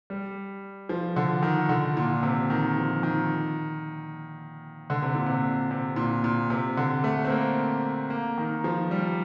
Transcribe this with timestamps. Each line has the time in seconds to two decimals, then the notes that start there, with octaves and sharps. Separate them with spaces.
0.10 G3
0.89 F3
1.16 D3
1.43 D#3
1.69 D3
1.97 A#2
2.23 C3
2.50 D#3
2.76 F3
3.03 D#3
4.90 D3
5.02 C3
5.15 A#2
5.26 C3
5.71 C3
5.96 A#2
6.24 A#2
6.50 C3
6.77 D3
7.04 A3
7.25 C4
7.30 A#3
8.10 A#3
8.38 D#3
8.64 F3
8.91 G3